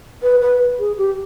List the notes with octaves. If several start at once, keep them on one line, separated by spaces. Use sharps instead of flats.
B4
B4
G#4
G4